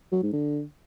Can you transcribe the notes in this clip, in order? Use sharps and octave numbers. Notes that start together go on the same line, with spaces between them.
F#3
G#2
D3